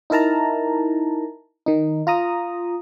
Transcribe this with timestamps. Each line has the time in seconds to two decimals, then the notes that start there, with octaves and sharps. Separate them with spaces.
0.10 D#4 E4 A#4 A5 A#5
1.66 D#3 D#4
2.07 F4 A#5 D#6